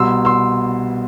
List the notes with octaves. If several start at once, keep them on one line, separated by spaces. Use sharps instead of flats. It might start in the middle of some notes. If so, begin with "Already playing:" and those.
Already playing: C2 B2 C6 E6
C6 E6